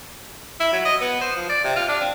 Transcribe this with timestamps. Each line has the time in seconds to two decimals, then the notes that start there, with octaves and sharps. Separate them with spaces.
0.60 E4
0.73 F#3
0.85 D#5
1.01 B3
1.21 C5
1.36 F3
1.50 D5
1.64 C3
1.76 F4
1.89 D4
2.01 C4